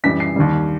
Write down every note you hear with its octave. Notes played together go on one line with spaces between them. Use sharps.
F#2 E3 G3 B6
C7
D#2 D#3 G3